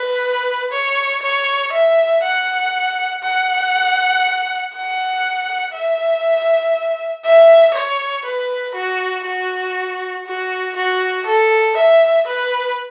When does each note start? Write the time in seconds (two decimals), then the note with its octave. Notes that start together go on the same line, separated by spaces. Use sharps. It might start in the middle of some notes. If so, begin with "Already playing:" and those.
Already playing: B4
0.72 C#5
1.23 C#5
1.72 E5
2.23 F#5
3.23 F#5
4.74 F#5
5.73 E5
7.25 E5
7.75 C#5
8.25 B4
8.75 F#4
9.25 F#4
10.26 F#4
10.76 F#4
11.26 A4
11.76 E5
12.27 B4